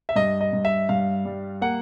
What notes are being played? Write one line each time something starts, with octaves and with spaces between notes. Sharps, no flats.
E5
G2 D#5
D#5
G2
E5
G2 F5
G3
A#3 F#5